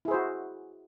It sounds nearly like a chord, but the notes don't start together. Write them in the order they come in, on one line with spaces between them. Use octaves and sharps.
E4 G#4 C5 F#4